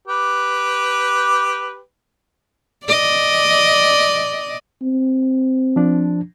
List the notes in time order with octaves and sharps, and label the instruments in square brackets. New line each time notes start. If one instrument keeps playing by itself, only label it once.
[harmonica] G4 B4
[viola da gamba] D5 D#5
[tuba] C4
[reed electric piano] F3 D4